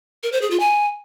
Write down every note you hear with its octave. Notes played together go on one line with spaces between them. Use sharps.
A#4
C5
G#4
F4
G#5